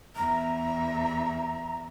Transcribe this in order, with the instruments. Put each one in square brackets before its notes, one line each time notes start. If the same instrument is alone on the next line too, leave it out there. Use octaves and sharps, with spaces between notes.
[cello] E2 E5 [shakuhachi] A#5